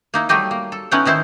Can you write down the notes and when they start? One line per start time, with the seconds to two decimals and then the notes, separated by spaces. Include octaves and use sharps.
0.14 A#3 D#4 E4
0.29 F#3 G3 A3 G4 D#5
0.51 A#3
0.72 A4
0.91 B3 C#4 D#4 E4 F#5 G5
1.05 D#3 D#4 E4 C5